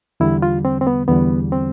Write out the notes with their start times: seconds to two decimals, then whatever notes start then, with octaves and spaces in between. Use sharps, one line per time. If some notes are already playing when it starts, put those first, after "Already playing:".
0.20 E2 D3 G3 E4
0.42 F4
0.65 C4
0.81 C4
0.87 B3
1.08 E2 D3 G3 B3
1.52 C4